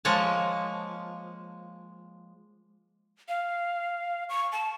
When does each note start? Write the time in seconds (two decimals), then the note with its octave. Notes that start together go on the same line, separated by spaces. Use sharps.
0.05 F3 G#3 A#3 C#5 A5
3.29 F5
4.29 C#6
4.52 A5